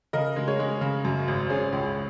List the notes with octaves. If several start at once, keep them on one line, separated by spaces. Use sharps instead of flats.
C#3 A#4 D#5
G#3
G#4 C#5
G#3
C#3
F#2
G#1
C#4 G#4
C#2